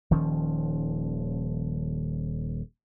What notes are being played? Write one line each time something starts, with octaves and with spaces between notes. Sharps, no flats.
D#1 D#3 F3 C#4